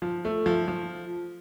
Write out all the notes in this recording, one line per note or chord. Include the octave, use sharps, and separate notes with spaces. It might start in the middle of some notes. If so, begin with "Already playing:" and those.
F3
A3
F3
F3